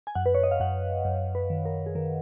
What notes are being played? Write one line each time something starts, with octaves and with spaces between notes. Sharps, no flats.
G#5
F#2 F#5
B4
C#5
D#5
F5
F#2 F#5
F#2
B4
D#3
A#4
G#4
D#3 A#4